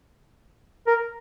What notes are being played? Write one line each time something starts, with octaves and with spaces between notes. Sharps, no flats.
A#4